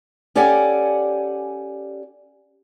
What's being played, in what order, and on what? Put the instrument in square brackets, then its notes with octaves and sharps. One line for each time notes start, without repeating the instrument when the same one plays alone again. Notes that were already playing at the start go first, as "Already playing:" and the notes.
[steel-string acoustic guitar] C#4 G4 A4 D5 F#5 G#5